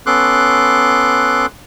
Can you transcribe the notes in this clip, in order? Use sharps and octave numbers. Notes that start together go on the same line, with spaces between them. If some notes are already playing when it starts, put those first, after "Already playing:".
B3 C#4 A4 C6 D6 F#6